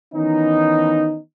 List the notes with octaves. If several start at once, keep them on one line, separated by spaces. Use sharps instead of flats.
D#3 E3 B3 C#4 D#4